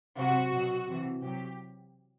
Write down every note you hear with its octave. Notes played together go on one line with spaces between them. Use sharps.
C3 F#3 F#4
B2 F#3
C3 E3
C3 F#3 G4